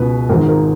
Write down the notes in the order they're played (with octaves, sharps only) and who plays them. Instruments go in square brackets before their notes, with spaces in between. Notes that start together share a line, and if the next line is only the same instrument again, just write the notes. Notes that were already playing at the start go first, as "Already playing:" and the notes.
Already playing: [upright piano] C#2 B2 B4
G#1 G#2 D#3 A#4
A#4